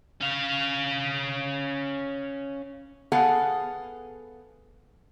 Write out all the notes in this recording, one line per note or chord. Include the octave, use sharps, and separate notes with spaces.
C#4 F5
B3 G#4 A4 F5 F#5 G#5